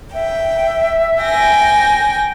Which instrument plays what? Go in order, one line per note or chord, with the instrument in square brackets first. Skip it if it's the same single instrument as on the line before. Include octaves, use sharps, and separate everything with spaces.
[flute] E5 [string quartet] G5
[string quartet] G5 G#5 A#6